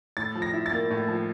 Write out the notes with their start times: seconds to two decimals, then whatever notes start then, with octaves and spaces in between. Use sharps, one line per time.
0.17 A2 A6
0.35 F3
0.42 A#6
0.53 E4
0.66 A6
0.72 A#3
0.90 A2
1.08 F3